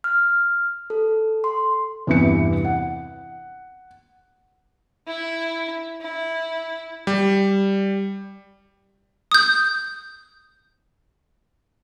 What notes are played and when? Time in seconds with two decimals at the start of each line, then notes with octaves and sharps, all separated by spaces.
0.04 F6
0.90 A4
1.44 C6
2.07 E2 G2 C3 E3 E4 C#7
2.65 F#5
5.07 E4
6.01 E4
7.07 G3
9.32 D#6 G6